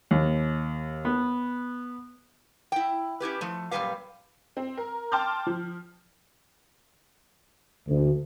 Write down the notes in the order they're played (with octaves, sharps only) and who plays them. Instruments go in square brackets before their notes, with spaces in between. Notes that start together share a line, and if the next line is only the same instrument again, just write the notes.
[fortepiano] D#2
B3
[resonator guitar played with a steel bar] E4 G5
C#4 E4 G4 B4
F3 A3
F#2 A#2 D#3 G3 B4 F5
[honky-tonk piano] C4
A#4
G5 A5 C6 D6 F6 G6
F3
[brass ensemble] D2